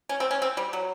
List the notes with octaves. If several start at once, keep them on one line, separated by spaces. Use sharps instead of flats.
C#4
C4
C#4
C4
G3
F#3